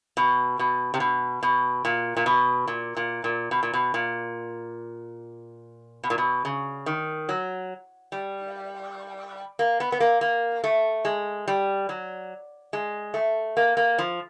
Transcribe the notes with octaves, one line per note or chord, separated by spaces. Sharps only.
B2
B2
C3
B2
B2
A#2
A#2
B2
A#2
A#2
A#2
B2
A#2
B2
A#2
B2
A#2
B2
C#3
D#3
F#3
G3
A#3
B3
B3
A#3
A#3
A3
G#3
G3
F#3
G#3
A3
A#3
A#3
F3